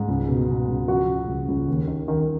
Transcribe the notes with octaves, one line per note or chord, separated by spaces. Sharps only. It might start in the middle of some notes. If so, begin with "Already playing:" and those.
Already playing: G#2
C#2
B2
B2
C#2
F3 F#4
C#3
C#2
C#2
D#2
D#3
D#3